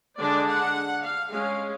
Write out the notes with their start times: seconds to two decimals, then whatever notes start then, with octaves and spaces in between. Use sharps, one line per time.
0.18 D3 G#3 D4 D5
0.46 F#5
1.03 F5
1.31 G#3 C#4 F5